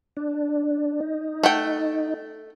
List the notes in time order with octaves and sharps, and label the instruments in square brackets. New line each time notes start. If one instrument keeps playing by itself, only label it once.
[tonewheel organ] D4
D#4
[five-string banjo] A3 F#5 G5